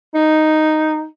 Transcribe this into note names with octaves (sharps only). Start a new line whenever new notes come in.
D#4